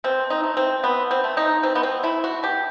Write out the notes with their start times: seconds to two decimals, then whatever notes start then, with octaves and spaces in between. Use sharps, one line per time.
0.04 B2 C4
0.30 D#4
0.43 A3
0.57 C4
0.83 B2 B3
1.11 C4
1.24 A3
1.37 D#4
1.63 B2 C4
1.75 B3
1.83 C4
2.03 A3 E4
2.24 F#4
2.43 B2 G4